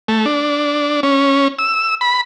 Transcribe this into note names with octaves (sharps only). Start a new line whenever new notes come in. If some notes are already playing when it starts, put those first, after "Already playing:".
A3
D4
C#4
E6
B5